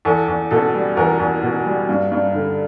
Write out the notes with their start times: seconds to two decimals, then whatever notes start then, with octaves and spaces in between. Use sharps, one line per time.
0.05 E2 A4
0.28 E2
0.51 B2 A4
0.74 G3
0.97 E2 A#4
1.20 E2
1.43 B2
1.66 G3
1.89 G2
2.11 G2
2.34 D3